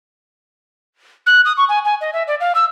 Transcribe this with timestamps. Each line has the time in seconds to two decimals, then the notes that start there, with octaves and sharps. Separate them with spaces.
1.26 F#6
1.45 D#6
1.57 C#6
1.69 G#5
1.85 G#5
2.01 D#5
2.13 E5
2.28 D5
2.40 F5
2.55 E6